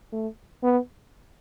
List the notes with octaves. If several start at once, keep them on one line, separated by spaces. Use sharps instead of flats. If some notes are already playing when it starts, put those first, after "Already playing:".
A3
B3